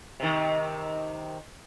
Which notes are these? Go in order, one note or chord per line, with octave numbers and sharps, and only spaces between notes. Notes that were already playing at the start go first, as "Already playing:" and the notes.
C3 D#3